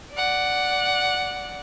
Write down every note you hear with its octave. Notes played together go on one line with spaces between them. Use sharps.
D5 F#5